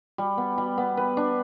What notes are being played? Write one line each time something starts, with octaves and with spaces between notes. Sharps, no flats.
G3
B3
G3
B3
B4
D4